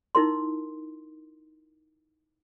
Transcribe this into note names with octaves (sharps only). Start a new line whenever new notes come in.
D#4 E4 A#4 C6